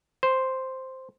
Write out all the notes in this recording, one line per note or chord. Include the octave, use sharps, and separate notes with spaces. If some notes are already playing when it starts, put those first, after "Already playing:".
C5